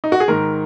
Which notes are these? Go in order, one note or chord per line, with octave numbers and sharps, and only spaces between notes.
D#4
F#4
G#4
G#2 D#3 A#4